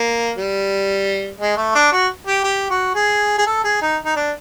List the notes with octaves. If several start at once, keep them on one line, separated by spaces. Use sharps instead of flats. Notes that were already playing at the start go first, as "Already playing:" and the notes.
Already playing: A#3
G3
G#3
A3
D4
F#4
G4
G4
F#4
G#4
G#4
A4
G#4
D#4
D#4
D4